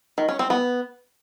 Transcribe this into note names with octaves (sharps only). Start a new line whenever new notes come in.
D#3
C#4
C4
B3